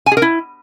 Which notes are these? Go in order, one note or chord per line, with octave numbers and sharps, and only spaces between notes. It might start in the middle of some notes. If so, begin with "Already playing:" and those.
G#5
G#4
A#4
E4